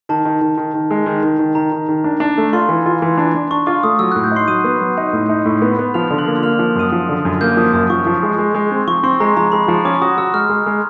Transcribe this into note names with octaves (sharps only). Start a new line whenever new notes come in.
D#3 A5
D#3
D#3
D#3
D#3
G#3
D#3
D#3
D#3
D#3 A#5
D#3
D#3
D4
D4
A3
F4 C6
E3
F4
E3
D4
D4
D4 C#6
F4 D6
A3 D#6
F#3 E6
F#6
A2
G6
D#4 C6 C7
F#3 D#6 D#7
B3
F#3
D#4
A2
D#4
A2
B3
B3
F3 F6 F7
D3
F#6 F#7
A#3
A#3 F6 F7
F3
F#2 D#6 D#7
F3
D3
F#2
A#3 G6
F3 D#6
F#2 D#6
F3 C#6
F3
G#3
G#3
G#3
C4
F3 C#6
C4 C6
G#3 A#5
F3 A#5
G#3 B5
F3
C#4 D6
F#4 D#6
F#4 E6
G#3 F6
G#3
G#3